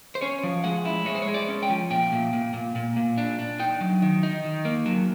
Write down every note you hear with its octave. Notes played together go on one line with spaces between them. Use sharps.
C5
C#4 C#5
F3
G#3 F#5
E4
G#3 C#5
C5
C#5
G#3
D5
C#4
G5
F3
A#2 G5
A#2
A#2
A#2
A#2
A#2
D4
D4
D#4 G5
F#3
D#3
D#4
D#3
A#3
F#3